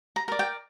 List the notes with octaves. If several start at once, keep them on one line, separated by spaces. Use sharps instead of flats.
A#5
A#4 D5
G5